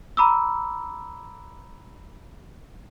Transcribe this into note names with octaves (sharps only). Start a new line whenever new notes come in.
A#5 B5 D6 E6